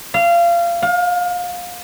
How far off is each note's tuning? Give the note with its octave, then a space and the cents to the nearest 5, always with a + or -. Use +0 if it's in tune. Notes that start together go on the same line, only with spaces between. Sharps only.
F5 -25
F5 +30